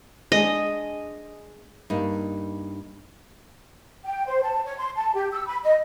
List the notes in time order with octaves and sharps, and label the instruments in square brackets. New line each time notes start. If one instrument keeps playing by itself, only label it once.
[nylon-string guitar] G#3 D4 G#4 [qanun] D#5
[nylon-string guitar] G2 A#3 D#4
[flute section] G5
C5
A5
C#5
C6
A5
G4
E6
B5
D#5